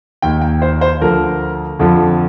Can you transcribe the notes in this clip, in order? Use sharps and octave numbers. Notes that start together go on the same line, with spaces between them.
D#2 D#3 G5
G5
C5
C5
D2 D3 F3 A#4
F2 D3 F3